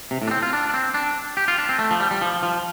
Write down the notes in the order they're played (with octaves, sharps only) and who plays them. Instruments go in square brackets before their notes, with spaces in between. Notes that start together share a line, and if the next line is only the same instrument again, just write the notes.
[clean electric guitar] C3
A2
D4
C4
F4
D4
D4
C4
D4
G4
F4
D4
C4
A3
F3
G3
G3
F3
F3